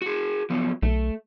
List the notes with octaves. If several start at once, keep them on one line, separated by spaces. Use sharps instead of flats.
F#4 G#4
F3 F#3 B3
B1 A3